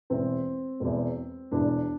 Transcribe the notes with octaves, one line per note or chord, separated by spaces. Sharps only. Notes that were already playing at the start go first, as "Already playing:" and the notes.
E1 E2 E3 C4
E1 E2 E3
E1 E2 E3 D4